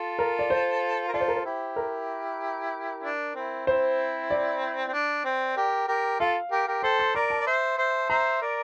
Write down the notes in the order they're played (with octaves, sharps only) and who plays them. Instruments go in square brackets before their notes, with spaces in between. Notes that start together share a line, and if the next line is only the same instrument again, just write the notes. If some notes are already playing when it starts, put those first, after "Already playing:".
Already playing: [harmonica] F4 A4
[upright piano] A#4
D5
C5
[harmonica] A#4
[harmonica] F4 A4 [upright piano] D5
[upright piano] C5
A#4
C5
[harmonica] E4 G4
[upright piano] A#4
[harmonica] D4
C4 E4
[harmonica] C4 E4 [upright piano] C5
[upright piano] D5
[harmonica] C4
D4
C4
G4 A#4
G4 A#4
[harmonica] F4 A4 [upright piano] F5
[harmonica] G4 A#4
G4 A#4
[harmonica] A4 C5 [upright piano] G5
[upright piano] C6
[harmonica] A#4 D5 [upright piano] A#5
[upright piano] A5
[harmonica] D5
C5 E5
C5 E5
[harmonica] C5 E5 [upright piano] A#5
[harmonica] A#4 D5